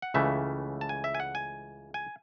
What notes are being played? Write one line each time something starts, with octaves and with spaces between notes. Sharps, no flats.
F#5
C#2 C#3 E3 A3 E5
A5
G#5
E5
G#5
F#5
G#5
G#5